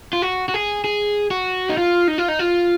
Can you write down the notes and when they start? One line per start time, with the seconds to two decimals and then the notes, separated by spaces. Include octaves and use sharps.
0.13 F4
0.22 F#4
0.49 F#4
0.54 G#4
0.84 G#4
1.31 F#4
1.69 D#4
1.78 F4
2.08 D#4
2.18 F4
2.28 D#4
2.39 F4